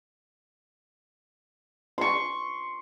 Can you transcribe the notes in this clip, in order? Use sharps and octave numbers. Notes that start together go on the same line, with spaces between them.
C6 C#6